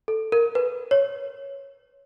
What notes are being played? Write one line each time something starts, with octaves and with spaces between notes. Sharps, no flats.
A4
A#4
B4
C#5